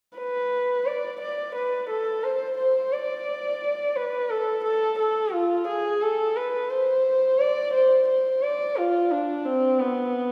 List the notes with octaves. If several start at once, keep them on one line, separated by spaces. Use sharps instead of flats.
B4
D5
D5
B4
A4
C5
C5
D5
B4
A4
A4
A4
F4
G#4
A4
B4
C5
D5
C5
C5
D5
F4
D4
C4
B3